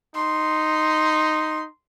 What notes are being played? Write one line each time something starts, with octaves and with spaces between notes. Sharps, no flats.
D#4 C6